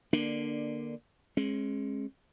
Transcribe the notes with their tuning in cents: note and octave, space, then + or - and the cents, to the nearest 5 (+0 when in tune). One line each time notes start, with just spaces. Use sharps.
D3 +10 A#3 +20 D4 +20
G#3 +5 C#4 -40